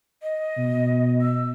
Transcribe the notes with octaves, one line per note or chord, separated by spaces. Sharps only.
D#5
B2
E6